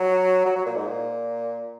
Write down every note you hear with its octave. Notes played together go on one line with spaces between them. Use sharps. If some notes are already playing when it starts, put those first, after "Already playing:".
Already playing: F#3
F#3
F#3
A#2
G#2
A#2